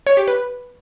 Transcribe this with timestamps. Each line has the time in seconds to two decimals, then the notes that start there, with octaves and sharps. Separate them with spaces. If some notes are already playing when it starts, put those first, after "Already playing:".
0.07 C#5
0.17 G4
0.28 B4